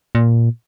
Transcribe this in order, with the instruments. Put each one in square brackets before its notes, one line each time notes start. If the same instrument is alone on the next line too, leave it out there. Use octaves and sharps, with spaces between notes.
[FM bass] A#2